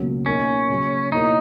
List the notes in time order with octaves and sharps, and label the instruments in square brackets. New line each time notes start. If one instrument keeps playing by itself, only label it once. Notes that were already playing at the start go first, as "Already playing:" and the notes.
Already playing: [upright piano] C#2 B2 F#3 A#3 C#4
[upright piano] B2 A#3 D#4 A#4 [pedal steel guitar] C#4
[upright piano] C#3 F#3 A#3
[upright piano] B2 A#3 E4 A#4 C#5 [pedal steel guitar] D#4